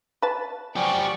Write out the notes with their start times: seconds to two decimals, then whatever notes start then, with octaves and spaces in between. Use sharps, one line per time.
0.22 B4 A5
0.76 F3 F#3 G4 C5 D5 F#5 G#5 C#6